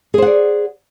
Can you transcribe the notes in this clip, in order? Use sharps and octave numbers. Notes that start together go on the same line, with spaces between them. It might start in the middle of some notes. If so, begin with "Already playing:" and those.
G#4 C5 D5 F#5